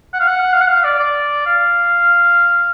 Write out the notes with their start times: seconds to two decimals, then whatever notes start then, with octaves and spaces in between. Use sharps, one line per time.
0.14 F#5
0.20 F5
0.27 F#5
0.53 F5
0.61 F#5
0.68 F5
0.84 D5
0.99 D5
1.46 F5